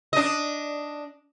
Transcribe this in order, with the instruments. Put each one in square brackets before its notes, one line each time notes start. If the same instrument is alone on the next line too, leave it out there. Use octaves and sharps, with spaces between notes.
[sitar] D4 D#5